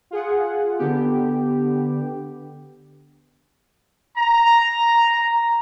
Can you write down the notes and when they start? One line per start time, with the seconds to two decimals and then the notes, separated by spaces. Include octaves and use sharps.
0.11 F4 G#4 F#5
0.78 D3 B3 G4
4.16 A#5